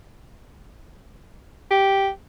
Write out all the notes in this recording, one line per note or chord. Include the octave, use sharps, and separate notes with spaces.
G4